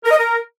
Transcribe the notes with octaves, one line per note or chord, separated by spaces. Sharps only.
A#4
D#5
A#4